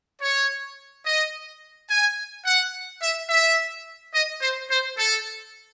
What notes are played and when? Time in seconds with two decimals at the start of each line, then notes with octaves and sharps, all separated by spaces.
0.22 C#5
1.06 D#5
1.89 G#5
2.45 F#5
3.02 E5
3.29 E5
4.14 D#5
4.41 C5
4.70 C5
4.98 A4